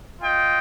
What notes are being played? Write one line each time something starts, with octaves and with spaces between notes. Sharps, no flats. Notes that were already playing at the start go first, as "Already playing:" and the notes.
F4 D#5 G5